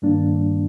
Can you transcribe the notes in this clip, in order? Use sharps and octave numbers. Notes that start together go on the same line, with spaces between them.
G2 D#3 G3 A#3 D4